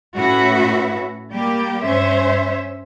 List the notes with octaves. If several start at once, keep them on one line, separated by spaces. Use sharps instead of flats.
A2 C#4 F#4 B4 E5
G3 A#3 G4
G2 C#4 C5 E5